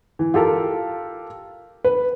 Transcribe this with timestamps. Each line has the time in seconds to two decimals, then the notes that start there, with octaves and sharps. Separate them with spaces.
0.19 E3
0.34 F4 G4 A4 A#4
1.84 B4